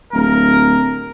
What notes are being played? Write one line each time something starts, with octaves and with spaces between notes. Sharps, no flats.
D1 A#4